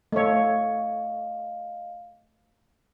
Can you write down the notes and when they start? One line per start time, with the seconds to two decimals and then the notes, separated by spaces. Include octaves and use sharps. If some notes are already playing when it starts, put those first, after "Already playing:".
0.12 A3 C#5 D#5 F5